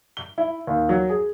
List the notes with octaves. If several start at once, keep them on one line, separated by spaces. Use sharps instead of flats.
G7
E4
D#2
F#3
G#4